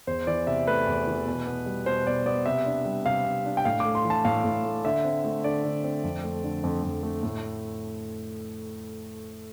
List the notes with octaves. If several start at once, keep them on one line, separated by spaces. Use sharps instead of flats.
E2 C5
E3 D5
C3 E5
A3 B4
E2
E3
B2
B3
G3
B2 C5
B2 D5
B3 D5
C3 E5
D4
G3
C3 F5
C3
D4
G5
A2 F5
D6
A3
C6
E3
A5
A2 F5
A2
A3
D3 E5
C4
A3
D3 D5
D3
C4
F2
A3
D3
F2
F2
A3
A2